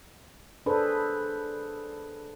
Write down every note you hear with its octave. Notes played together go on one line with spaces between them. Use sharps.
D4 G#4 A4 B4 C5